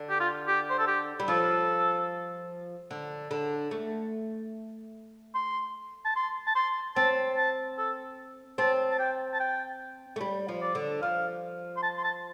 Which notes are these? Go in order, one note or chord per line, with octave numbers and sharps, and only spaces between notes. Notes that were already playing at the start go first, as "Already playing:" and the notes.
Already playing: D3
G4
F4
G4
C5
A4
G4
G3
F3 A4
D3
D3
A3
C6
A5
C6
A5
C6
C4 A5
A5
A4
C4 A5
A5
G5
A5
G5
A3
G3
F3
D5
D3
F3 F5
C6
A5
C6
A5